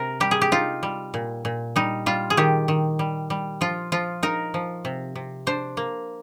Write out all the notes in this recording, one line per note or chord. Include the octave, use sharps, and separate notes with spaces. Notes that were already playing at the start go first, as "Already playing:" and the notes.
Already playing: C3 A#4
G3 G4
G#4
G4
D#4 F4
G3
A#2
A#2
G3 D#4
G3 F4
G#4
D#3 G4
D#3
G3
G3
F3 F4
F3 F4
D#4 A#4
F3
C3
C3
D4 C5
A#3